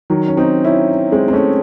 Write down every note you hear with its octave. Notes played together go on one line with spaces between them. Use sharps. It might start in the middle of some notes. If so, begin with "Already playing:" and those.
D#3 F#3
C#4
C4 D#4
C#4 E4
G#3 C4
C4
A3 C#4